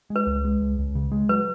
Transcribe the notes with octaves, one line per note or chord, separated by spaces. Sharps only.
G#3
B4
C#2
G#3
C#2
C#2
C#3
G#3
F#3 B4